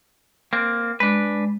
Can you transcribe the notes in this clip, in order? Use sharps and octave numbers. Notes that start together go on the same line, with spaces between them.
A#3 C4
G#3 D4 B4